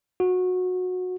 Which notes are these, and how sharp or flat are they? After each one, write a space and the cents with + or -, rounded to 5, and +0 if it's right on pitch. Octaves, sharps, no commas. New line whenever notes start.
F#4 -20